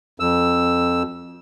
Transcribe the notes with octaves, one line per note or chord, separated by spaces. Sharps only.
F2 E6